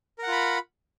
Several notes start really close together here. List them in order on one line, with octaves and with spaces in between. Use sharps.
A#4 F#5 F4 B5